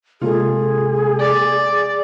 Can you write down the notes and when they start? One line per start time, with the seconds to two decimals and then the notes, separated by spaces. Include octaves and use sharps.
0.22 C3 G#3 A#3 F4 G#4 A4
1.19 D5